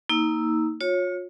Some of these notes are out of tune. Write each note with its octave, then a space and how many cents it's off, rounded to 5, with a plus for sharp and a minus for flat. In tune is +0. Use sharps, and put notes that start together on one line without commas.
A#3 -5 D#4 +25 E6 +0
F4 +40 C#5 -10